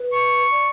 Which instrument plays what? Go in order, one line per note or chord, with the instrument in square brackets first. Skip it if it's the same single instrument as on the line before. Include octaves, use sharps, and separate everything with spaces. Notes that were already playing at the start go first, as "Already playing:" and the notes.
Already playing: [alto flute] B4
[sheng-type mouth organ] C#6
[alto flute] D5